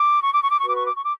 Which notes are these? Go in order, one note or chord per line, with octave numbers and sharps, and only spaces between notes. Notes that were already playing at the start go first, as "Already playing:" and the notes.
Already playing: D6
C#6
D6
C#6
D6
F#4 B4 C#6
D6
C#6
D6
C#6
D6